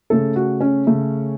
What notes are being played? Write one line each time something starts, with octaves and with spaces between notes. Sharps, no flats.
C#3 A3 A4
F#4
C#4
C#3 A3